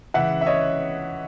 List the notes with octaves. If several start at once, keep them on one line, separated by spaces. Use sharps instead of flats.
C#2 C#3 E3 E5 F#5
E5
C#5 D#5